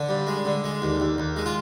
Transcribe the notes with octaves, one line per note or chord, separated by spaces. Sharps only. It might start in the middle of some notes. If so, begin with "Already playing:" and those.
Already playing: D3 D4
G2
G#3
D3
G#3
D#2
D#2
D#2
G#3
F4